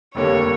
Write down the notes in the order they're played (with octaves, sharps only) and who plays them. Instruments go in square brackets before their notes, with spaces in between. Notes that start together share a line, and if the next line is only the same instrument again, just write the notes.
[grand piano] F1 D#2 D3 G3 A#3 [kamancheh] C#5